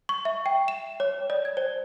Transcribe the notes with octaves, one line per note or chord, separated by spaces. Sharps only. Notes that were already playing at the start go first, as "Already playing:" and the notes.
C#6
E5
G5
E7
C#5
D5
G#6
C5